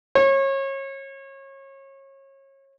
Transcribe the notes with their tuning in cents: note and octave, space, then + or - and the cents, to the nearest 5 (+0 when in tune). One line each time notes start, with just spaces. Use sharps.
C#5 -30